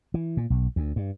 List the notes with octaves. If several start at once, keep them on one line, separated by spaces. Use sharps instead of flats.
E3
A#2
B1
D2
G2